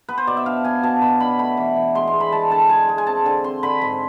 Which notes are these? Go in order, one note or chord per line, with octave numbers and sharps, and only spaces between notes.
B3 B4
C5
B2 D5
E5
D4 F5
B3 G#5
B2 A5
B2 B5
D4 B5
A3 B5
E3
E3
G#3 C6
C6
G#3
B5
G#3 A5
D3 A5
G#3 G#5
G#3
G#5
C4 A5
D3 G#5
C4 C6
D3 B5
G#2 C6